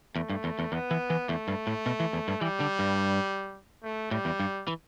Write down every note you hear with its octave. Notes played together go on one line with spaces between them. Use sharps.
E2 A3
G2
E2
E2
E2 B3
E3
E3
E2 A3
G2
A2
B2
E3
E2
G2
E3 G3
D3
G2
A3
A2 G3
E2
G2
E3